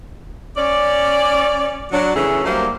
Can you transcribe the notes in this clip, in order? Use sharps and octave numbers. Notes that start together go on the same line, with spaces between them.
C#4 D5
F#3 D4
C#3 E3 A3 C#4 G#4 A4
F#3 G3 A3 A#3 D4 C5